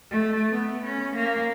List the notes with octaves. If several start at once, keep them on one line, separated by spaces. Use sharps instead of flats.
A3
B3
C#4
A#3